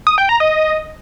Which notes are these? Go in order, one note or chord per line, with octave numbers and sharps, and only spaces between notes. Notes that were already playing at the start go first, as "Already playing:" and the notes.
D#6
G5
A#5
D#5